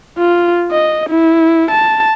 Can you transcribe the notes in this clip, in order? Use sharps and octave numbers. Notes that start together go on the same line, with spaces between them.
F4
D#5
E4
A5